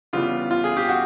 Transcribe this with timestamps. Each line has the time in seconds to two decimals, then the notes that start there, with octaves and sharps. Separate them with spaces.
0.13 C#3 E3 G3 B3 F4
0.51 F4
0.64 G#4
0.77 G4
0.89 F#4